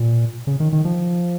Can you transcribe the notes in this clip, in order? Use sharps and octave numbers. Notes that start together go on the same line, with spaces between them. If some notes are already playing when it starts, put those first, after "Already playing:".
Already playing: A#2
C#3
D#3
D#3
F3